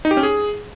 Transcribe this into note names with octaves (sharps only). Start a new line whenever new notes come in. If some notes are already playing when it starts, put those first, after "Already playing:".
D#4
G4
C#4
G#4